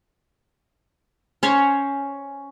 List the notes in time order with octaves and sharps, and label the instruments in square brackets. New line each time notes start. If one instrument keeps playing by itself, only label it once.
[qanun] C#4 C5 C#5